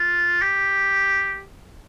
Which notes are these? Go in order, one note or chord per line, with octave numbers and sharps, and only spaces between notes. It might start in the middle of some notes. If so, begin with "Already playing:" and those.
Already playing: F4
G4